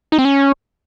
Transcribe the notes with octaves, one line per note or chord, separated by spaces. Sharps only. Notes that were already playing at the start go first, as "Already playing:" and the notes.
D#4
C4
C#4